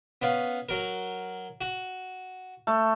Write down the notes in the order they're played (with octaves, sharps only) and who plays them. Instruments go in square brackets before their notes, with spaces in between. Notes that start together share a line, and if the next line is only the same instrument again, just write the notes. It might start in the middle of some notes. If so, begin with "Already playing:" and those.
[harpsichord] B3 C#4 F5
F#3 A#4
F#4
[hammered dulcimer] A3